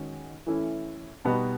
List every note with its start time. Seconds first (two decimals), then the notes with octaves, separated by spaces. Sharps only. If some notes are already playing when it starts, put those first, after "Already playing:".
Already playing: D#3 G#3 C#4 F#4
0.47 E3 A3 C#4 E4
1.25 B2 G3 B3 D#4 F#4